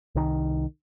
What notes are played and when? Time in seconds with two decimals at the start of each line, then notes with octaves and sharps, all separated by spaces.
0.15 C2 D#3